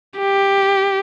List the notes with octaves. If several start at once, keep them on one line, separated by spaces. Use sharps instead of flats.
G4